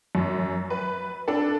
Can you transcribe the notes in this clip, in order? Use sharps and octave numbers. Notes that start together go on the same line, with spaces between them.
F#2
B4
D4 A4